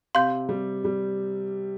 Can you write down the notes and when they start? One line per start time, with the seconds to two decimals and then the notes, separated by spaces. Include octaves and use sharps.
0.15 C3 F5 C6 G6
0.49 G3
0.85 G3